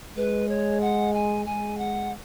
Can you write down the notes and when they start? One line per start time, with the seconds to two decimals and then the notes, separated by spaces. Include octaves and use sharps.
0.16 G#3 B4
0.49 C#5
0.81 F#5
1.13 G#5
1.46 G#3 G#5
1.78 F#5